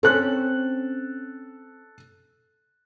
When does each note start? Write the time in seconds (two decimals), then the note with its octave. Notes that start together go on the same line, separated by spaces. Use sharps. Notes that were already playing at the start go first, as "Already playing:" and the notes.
0.03 C4 C#4 A4 F#6